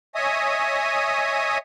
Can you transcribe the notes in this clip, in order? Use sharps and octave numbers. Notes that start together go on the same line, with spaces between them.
C#5 D#5 E5 G#5 D#6